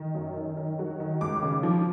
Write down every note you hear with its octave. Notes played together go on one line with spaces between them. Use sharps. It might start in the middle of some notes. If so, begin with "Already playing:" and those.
Already playing: D#3
F#2
D#3
D#3
F#3
D#3
C#2 D6
C#3
F3